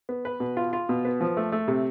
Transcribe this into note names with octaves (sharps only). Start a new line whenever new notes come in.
B3
B4
B2
F4
F4
B2
B3
F3
A3
A3
C3